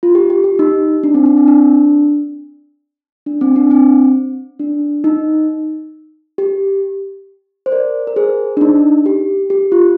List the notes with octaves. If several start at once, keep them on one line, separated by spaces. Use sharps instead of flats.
F4
G4
G4
G4
D#4
D4
C4
D4
C4
D4
D4
C4
D4
C4
D4
D#4
G4
C5
A#4 D5
A#4
G#4 C5
D4
D#4
G4
G4
F4